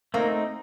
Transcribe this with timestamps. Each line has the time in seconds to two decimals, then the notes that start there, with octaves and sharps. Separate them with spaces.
0.14 A3 A#3 C4 D#4